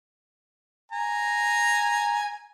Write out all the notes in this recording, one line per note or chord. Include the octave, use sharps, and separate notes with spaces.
G#5 A#5